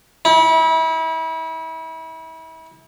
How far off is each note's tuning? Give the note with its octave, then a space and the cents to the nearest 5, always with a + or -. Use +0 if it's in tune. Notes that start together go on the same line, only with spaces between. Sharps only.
E4 -35